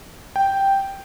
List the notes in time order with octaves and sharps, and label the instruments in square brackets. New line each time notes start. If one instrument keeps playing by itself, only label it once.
[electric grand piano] G5